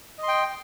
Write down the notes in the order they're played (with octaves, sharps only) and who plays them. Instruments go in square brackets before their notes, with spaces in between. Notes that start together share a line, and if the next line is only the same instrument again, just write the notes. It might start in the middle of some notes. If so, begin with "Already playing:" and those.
[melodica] D#5
C6
G5